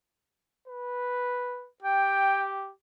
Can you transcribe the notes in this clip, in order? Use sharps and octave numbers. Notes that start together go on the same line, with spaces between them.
B4
G4 G5